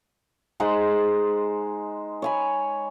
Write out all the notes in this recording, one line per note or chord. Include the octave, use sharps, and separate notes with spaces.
G#3 D#4 C5 F#5
C#5 G#5 B5